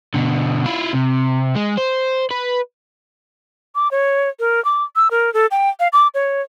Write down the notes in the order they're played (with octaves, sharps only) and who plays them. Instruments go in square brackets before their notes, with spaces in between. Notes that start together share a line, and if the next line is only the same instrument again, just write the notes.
[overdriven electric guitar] B2 D3
E4 F4
C3
G#3
C5
B4
[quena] D6
C#5
A#4
D6
E6
A#4
A4
G5
F5
D6
C#5